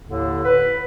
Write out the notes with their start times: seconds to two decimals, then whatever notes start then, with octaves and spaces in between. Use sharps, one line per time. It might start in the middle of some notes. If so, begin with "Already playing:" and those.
0.07 D#2 A2 D3
0.44 B4